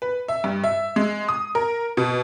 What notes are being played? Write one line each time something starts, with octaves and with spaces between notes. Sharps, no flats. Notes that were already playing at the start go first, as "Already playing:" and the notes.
B4
E5
G2
E5
G#3
D#6
A#4
B2